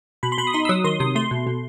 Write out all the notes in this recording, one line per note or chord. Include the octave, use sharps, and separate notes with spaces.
B2 B5
C6
B2 B5
D#6
D#4 C6
E6
F#3 D#6
D#3 C6
C3 D#6
A3 C6
B2
B2